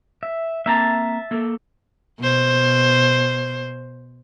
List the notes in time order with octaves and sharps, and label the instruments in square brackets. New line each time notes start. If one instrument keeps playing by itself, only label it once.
[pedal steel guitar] E5
[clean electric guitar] A#3 C4 A#5 [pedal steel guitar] E5 A5
[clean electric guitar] A#3 A4
[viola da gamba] B2 C5